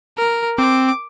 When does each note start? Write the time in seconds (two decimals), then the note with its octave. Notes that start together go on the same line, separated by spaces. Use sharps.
0.18 A#4
0.58 C4 D6